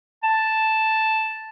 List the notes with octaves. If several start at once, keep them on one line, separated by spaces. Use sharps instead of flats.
A5